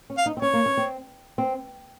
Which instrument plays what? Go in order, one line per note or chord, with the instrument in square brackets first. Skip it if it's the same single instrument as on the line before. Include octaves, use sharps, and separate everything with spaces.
[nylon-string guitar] C#4
[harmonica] F5
[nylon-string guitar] D#4
C4
[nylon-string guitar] C#4 [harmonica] C#5
[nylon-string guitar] A#3
C#4
C4
C4